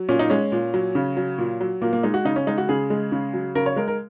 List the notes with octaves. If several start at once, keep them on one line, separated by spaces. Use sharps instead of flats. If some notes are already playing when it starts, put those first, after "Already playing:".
Already playing: F#3
A#2 C#4
D#4
G#3 C#4
A#2
F#3
C#3
F#3
A#2
F#3
A#2 A#3
A#3
G#3 D#4
F#4
C#3 D#4
C#4
G#3 D#4
F#4
C#3 G#4
G#3
C#3
F#3
C#3 A#4
C#5
G#3 A#4
A#4